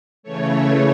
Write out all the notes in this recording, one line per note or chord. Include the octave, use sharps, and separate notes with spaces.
C#3 E3 A3 C#5